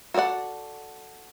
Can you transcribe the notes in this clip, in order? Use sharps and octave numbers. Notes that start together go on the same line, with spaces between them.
F#4 A4 C5 D5 F#5